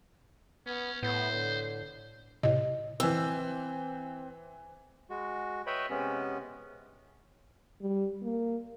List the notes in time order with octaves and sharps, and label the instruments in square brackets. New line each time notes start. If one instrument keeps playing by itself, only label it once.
[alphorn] B3 [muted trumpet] C#4
[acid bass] A2 [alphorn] B3 [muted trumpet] C5
[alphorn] D3
[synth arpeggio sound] A2 C3 [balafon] D#5
[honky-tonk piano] E3 E6 [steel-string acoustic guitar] C4
[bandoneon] G#3 F#4
B4 C#5 D#5 E5 G5 B5
C3 G#3 B3 C#4
[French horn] G3
A#3